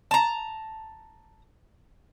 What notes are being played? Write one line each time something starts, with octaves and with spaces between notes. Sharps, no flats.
A5 A#5